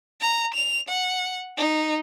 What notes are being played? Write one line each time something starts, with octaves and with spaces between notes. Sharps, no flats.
A#5
F7
F#5
D#4